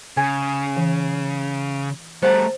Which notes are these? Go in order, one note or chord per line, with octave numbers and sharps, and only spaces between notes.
C#3 G#5
E3
G3 A3 C5 F#5 A5 A#5